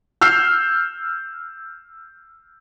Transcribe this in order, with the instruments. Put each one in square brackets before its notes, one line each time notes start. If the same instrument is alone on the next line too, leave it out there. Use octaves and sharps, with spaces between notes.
[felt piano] E6 F6 G6 C7